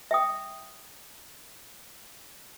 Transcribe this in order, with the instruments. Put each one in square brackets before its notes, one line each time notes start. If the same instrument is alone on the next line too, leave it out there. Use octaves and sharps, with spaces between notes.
[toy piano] E5 G5 D#6